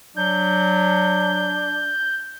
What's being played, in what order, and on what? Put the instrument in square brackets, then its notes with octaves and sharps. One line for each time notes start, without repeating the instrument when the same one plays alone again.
[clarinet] F#3 [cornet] D4 [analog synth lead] G6